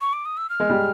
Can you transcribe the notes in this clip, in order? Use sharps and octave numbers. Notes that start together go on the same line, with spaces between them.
C#6
D6
D#6
E6
F6
G#3
G3